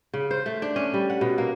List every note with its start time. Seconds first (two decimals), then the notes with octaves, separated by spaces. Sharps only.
0.14 C#3
0.31 C5
0.46 A3
0.62 D4
0.76 C#4
0.94 G3
1.10 F#5
1.21 B2
1.38 A#3